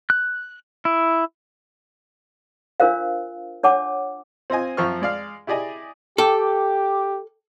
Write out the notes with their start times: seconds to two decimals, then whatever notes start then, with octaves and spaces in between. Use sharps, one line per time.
0.10 F#6
0.85 E4
2.80 D4 F4 A#4 C5 F5
3.63 D4 C#5 F#5 A5 D6
4.50 C4 F4 D#5 G#5
4.77 F#2 F3 C4 F4 C#6 F6
5.02 G#3 D5 F5 F6
5.47 E4 G4 G#4 D5 D#5 G#5
6.18 G4 A4 G5 D6